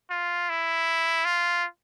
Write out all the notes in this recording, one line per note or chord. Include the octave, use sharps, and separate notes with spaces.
F4
E4
F4